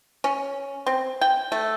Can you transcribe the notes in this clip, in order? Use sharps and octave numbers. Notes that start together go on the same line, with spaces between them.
C#4
C4
G5
A3